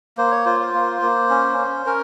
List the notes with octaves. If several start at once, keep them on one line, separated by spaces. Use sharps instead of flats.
A#3 C5
C#5
F4 C5
C5
A#3
A#3
C#4
C#4
C#4 A#4